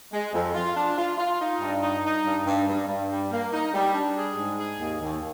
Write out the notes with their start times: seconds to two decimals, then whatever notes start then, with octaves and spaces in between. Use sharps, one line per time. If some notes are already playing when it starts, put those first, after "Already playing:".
0.13 G#3
0.34 F2
0.55 F4
0.76 D4
0.98 F4
1.18 F4
1.39 D#4
1.61 G2
1.82 D#4
2.03 D#4
2.25 G2
2.46 G2
2.67 G2
2.88 G2
3.09 G3
3.31 A#3
3.52 D#4
3.73 G3
3.94 D4
4.15 G#4
4.37 G#2
4.58 G#4
4.79 D#2
5.01 D#2